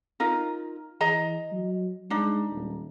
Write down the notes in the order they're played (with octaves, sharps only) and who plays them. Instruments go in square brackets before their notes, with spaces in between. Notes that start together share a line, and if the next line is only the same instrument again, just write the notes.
[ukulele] D#4 F4 A#4
[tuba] E3 [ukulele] G#4 D#5 A#5
[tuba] F#3
[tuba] G#3 [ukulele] D4 D#4
[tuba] D#1